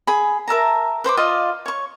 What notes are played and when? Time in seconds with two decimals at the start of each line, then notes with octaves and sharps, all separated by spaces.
0.07 G#4 B5
0.48 A#4 E5 A5 A#5
1.04 B4 C5 C6 D6
1.17 F4 D5 D#5 F5
1.66 C#5 C#6